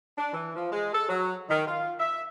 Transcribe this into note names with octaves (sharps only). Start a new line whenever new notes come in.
D4
E3
F3
G#3
A4
F#3
D#3
F4
E5